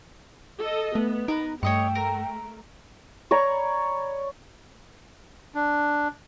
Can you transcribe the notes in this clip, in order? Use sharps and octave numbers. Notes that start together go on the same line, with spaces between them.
A4 D#5
A3 B3
D#4 A#4 B4
G2 A3 C#5 D#5 G5 C#6
A#4
C#5 D5 A#5 B5
D4